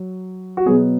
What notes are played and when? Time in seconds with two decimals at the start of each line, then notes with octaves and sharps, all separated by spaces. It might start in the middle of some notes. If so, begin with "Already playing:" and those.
Already playing: F#3
0.57 F#4
0.66 B2 F#3 B3 G#4